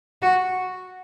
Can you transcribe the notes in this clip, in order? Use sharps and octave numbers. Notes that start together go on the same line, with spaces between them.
F#4